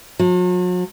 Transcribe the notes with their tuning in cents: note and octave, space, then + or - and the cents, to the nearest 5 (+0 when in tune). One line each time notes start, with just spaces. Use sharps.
F#3 -45